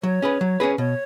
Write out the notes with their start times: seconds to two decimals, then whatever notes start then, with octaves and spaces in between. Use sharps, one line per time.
0.03 F#3 C#5
0.22 C#4 G#4 B4
0.41 F#3
0.60 C#4 G#4 B4
0.78 B2 C#5